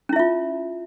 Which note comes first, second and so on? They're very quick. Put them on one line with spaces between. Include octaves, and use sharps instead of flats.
C#4 E4 E5 F4